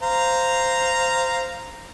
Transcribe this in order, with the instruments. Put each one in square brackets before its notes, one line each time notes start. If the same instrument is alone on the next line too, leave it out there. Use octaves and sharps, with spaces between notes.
[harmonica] C5 F5 A#5